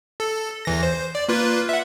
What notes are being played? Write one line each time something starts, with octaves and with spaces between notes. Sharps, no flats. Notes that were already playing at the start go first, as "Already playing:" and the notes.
A4
E2 E3 A#6
C5
D5
A#3 F4 B4
E5 F#5